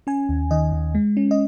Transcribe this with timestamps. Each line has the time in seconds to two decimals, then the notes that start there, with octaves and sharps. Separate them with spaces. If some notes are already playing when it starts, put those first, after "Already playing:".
0.07 C#4 G#5
0.29 D#2
0.51 D#3 D#5
0.72 D#2
0.95 G#3
1.17 C#4
1.31 D#5